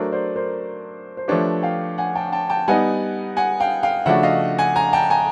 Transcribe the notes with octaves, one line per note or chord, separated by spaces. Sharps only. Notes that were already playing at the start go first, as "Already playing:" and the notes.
Already playing: F#3 A3 D4 A#4 C5
C5 D5
A#4 C5
C5
F3 A3 D4 G4 B4 C#5
F5 G5
F#5 G#5
G5 A5
G5 A5
G5 A5
G3 B3 D#4 F#5 G#5
F#5 G#5
F5 G5
F5 G5
C#3 F3 A3 D4 F#4 E5 F#5
D#5 F5
F#5 G#5
G#5 A#5
G5 A5
G#5 A#5